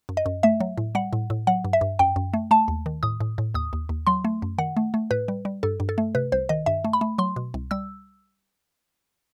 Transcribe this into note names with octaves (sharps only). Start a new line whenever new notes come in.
F#2
D#5
F#2
A3 E5
F#3
A2
G3 F#5
A2
A2
F#3 F#5
G2
E5
G2
F#2 G5
F#2
A3
A3 A5
D#2
D#3
A2 D#6
A2
A2
D#2 D#6
D#2
D#2
F#3 C6
A3
F#2
D#3 F#5
A3
A3
A2 B4
G3
G3
G2 A4
G2
A4
A3
C3 B4
C2 C5
D#3 D#5
G2 E5
A3
B5
A3
F#3 C6
B2
C2
G3 E6